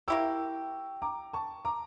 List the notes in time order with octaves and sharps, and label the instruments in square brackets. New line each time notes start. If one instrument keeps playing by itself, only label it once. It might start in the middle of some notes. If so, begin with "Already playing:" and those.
[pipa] A#3 E4 G4 [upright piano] C#6 E6
[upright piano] A#5 D6
A5 C#6
A#5 D6